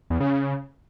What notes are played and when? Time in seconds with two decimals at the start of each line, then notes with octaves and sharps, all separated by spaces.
0.10 E2
0.20 C#3
0.30 C#3